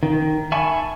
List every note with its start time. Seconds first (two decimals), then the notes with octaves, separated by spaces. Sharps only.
0.03 D#3
0.52 E5 G#5 A5 B5 C#6